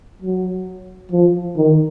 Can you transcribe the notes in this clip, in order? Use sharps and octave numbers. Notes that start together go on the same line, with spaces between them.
F#3
F3
D#3